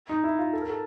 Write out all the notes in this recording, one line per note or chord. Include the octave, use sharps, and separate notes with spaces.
D#4
E4
F4
A4
A#4
A4